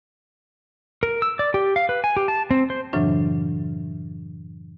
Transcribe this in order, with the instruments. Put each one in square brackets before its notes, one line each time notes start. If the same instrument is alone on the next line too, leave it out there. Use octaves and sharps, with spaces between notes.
[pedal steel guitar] A#4
E6
D5
G4
F5
B4
G#5
G4
A5
C4
C5
[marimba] F#2 A2 C#3 E3 F#3 D4